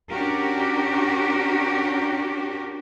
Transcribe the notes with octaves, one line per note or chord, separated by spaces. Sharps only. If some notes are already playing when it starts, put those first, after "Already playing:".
C#4 D4 F#4 G4 A#4